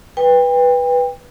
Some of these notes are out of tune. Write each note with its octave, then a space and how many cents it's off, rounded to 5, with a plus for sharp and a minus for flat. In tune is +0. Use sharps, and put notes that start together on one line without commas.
B4 -5 G5 +30